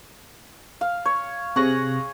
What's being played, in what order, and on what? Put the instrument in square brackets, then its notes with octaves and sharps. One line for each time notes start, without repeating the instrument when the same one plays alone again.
[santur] F5
C#5
[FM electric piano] C3 F#6 A#6 [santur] G#4 C#5